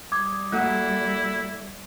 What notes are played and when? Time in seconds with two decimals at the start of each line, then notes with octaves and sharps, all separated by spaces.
0.12 G3 D6 D#6 G#6
0.52 A3 A#3 E4 F#4 F#6